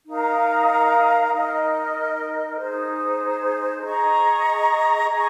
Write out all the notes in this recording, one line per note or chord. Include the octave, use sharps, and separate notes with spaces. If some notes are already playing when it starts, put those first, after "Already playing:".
D#4 A#4 F5 A#5
D#4 A#4 D#5
D#4 G#4 C5
G#4 D#5 A#5 C#6
G#4 D#5 A#5 C#6